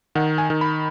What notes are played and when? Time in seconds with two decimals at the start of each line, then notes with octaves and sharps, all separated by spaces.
0.15 D#3 F#5
0.38 G#5
0.50 D#3
0.61 B5